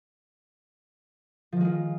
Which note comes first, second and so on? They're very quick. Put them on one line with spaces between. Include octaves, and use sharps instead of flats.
F3 D#3 G#3 F4